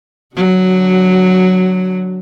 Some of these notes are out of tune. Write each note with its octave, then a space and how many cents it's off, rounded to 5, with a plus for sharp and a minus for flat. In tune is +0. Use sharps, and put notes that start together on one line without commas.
D3 +0 F#3 +0 F#4 +20